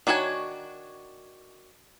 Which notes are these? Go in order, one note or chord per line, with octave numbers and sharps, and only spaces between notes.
D#3 D4 F#4 C#5 G#5